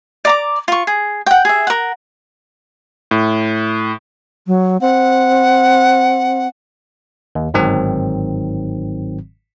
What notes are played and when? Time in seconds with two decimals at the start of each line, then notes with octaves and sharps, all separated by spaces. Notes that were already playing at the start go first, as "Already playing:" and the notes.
0.25 D5 A#5 D6
0.68 F4 C#6
0.87 G#4
1.26 F#5 G5
1.45 G#4 E5
1.67 A#4 F#5
3.11 A2
4.47 F#3
4.81 C4 F#5
7.35 D#2
7.54 G1 G#2 D#3 F#3 C4